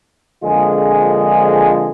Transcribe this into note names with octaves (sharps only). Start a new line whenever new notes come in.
A#1 F2 D3 G#3 F4 G#4